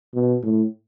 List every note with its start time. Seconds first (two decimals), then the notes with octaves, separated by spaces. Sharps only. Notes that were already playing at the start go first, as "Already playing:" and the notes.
0.14 B2
0.43 A2